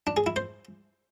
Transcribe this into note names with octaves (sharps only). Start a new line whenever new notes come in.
D4
G#4
E4
C5